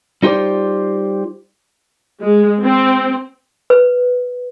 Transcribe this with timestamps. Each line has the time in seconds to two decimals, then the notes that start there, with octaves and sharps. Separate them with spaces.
0.23 G3 D#4 F4 G4 C5 D5
2.21 G#3
2.63 C4
3.70 B4